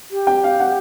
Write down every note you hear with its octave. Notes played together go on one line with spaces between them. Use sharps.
G4
G5
F5
F#5